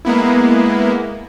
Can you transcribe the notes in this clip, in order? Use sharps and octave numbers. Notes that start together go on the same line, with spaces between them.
G#3 A#3 B3 E4